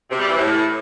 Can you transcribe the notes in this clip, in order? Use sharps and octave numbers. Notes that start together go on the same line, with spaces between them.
C3
G3
E3
A2